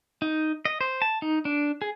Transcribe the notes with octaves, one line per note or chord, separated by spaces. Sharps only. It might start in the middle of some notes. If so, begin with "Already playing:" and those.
D#4
D#5
C5
A5
D#4
D4
G#4